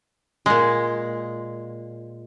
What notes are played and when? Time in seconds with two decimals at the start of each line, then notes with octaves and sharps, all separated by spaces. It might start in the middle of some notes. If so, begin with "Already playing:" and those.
0.46 A#2 G#3